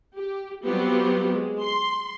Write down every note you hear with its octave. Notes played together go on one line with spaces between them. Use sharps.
G4
F#3 G3 B3 C4 F4 G4
G#3
C6